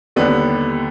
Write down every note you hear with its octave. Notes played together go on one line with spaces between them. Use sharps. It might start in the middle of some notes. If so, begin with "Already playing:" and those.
D#2 D3 G3 B3